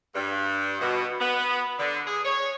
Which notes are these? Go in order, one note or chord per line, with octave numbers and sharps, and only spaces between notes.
G2
B2
B3
D3
G#4
C#5